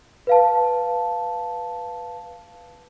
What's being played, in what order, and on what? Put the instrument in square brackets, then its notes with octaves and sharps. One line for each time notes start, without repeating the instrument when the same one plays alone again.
[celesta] B4 F5 A5